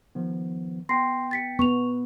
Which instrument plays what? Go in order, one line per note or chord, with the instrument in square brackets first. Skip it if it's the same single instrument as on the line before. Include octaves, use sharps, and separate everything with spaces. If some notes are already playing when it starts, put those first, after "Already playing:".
[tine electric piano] D#3 F3 B3
[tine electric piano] B3 G5 [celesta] C6 A#6 C7
[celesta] A6 B6 C#7
[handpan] B3 [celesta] C#6 F7